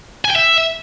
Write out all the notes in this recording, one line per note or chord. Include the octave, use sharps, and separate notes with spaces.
G#5
G5
E5